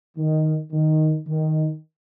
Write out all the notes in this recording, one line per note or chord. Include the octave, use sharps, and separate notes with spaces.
D#3
D#3
D#3